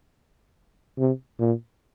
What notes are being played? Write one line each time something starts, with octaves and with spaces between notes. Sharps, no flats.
C3
A#2